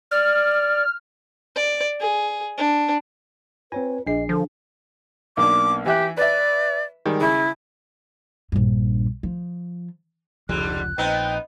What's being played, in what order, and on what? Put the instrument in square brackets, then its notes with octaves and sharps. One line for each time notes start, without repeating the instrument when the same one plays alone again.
[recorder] D5 [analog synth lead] F6
[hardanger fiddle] D5
G#4
D4
[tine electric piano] C4 C#5 G#5 [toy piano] F4 [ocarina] B4
[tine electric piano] A#1 C7 [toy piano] D4 G#4 [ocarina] D#5
[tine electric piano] D3 [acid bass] F3 [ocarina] A4
[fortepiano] B1 A#3 D4 [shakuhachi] D6
[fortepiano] E3 E5 F#6 [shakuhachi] G4
[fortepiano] B4 E5 [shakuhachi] D5
[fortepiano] D#3 G3 G#3
[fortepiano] C#3 [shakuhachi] E4
[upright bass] A#1 G2
F3
[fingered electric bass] F1 C#2 F3 [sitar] G#2 D3 G3 [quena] F#6
[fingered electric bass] A#1 [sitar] B3 C4 D#4 [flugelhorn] G5